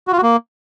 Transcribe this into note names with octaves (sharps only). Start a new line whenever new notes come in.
F#4
F4
F#4
A#3